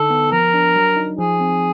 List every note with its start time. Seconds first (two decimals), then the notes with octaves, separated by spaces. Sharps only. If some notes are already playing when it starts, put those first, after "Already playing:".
Already playing: D3 D#4 A4
0.10 B3
0.32 F3 A#4
0.54 D4
0.76 F#3
0.97 D#4
1.19 F3 G#4
1.40 C4